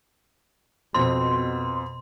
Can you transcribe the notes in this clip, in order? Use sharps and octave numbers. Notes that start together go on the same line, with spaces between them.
F2 B2 C4 C6